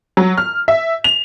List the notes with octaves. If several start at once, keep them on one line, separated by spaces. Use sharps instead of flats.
F#3
F6
E5
F7